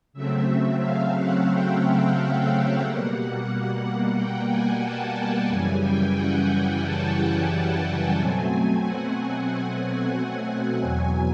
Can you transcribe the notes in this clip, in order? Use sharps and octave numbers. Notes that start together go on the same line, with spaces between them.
C#3 F#3 A3 C4 E5
F5
F#5
G5
B2 G3 A#3 F#5
G5
G#5
A5
F#2 C#3 E3 G3 G#5
G5
F#5
G5
A5
G#5
G5
G#5
B2 F#3 A3 C4
F#5
F#5
E2 B2 F#3 G#5